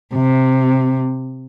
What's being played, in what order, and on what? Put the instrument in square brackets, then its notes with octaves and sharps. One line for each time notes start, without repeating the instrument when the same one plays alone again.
[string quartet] C3